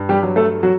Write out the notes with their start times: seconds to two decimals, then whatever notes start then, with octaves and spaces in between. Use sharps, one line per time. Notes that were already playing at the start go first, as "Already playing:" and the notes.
Already playing: G2
0.09 G3 G4
0.23 F#3
0.36 A3 A4
0.63 F#3 F#4